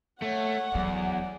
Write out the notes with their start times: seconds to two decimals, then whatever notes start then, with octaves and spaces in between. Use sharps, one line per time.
0.22 A3 C#5 F#5
0.75 E2 F#3 D5